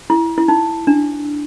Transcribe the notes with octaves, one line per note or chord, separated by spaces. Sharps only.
E4
E4
D#4
D4